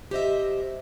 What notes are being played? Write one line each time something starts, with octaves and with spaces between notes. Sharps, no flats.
G4 C5 D#5 E5